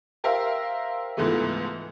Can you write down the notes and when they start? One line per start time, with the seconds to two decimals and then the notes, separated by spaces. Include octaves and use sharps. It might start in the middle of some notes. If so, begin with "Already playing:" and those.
0.24 G4 A#4 C5 E5 F5
1.17 C#2 G#2 E3 F3 A3 B3